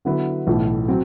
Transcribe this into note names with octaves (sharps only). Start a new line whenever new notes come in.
D3 F#3 B3 E4 B4
B1 A2 E3
F#3 C4